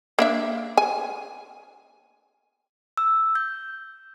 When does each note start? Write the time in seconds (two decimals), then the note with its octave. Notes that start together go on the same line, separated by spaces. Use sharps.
0.19 A#3 D4 E5
0.78 G#5
2.97 E6
3.35 G6